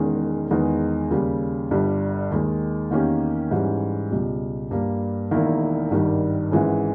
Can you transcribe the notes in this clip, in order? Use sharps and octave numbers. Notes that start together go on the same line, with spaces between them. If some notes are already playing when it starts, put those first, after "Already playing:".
Already playing: E1 E2 D#3 G#3 C#4
E2 D#3 G#3 B3 D#4
D#2 C#3 G3
G1 G2 G3
D#2 D#3 G#3
E2 D#3 A#3 C#4 G4
G#2 E3 G3 C#4
C#2 B2 G3
G2 G3 A#3
E1 E2 D#3 A#3 E4
G#1 G2 D#3 G3
G#1 G#2 E3 G#3 C#4